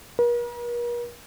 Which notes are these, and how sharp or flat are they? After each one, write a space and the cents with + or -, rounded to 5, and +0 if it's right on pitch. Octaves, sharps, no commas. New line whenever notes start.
A#4 +45